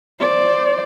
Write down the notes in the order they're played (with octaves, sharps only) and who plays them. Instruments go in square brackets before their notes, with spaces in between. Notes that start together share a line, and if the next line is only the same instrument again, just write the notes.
[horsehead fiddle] C5 D5